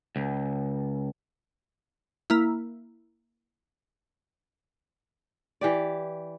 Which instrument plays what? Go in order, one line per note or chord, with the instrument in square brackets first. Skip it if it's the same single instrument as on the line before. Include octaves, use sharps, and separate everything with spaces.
[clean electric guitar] C#2
[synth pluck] A#3 E4
[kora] E3 G4 D5